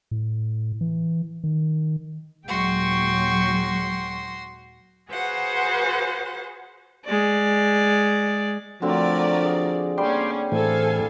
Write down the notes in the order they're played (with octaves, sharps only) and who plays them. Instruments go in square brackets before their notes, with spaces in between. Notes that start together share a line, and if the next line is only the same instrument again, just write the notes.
[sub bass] A2
E3
D#3
[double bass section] D#2 A#2 G#3 [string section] F#3 [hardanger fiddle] F#4 C6 [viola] G5 C#6
[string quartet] F#4 G#4 B4 C5 F5 F#5
[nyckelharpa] G#3 D5
[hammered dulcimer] D3 F#3 C4 [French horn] F3 [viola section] A3 A#4 D5
[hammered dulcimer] G#4
[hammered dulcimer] G3 [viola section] A#3 C#4 [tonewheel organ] D5 G5 C6
[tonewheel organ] A2 E3 A3 [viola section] A4 F5 G#5 [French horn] C5